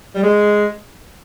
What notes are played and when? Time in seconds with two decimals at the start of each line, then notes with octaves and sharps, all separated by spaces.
0.15 G3
0.23 G#3